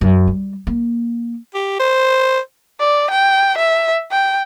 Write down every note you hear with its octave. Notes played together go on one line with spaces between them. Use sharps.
F#2
G3
A#3
G4
C5
D5
G5
E5
G5